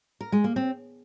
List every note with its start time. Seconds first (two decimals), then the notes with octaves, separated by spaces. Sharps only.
0.21 A#4
0.32 G#3
0.44 A#3
0.56 C4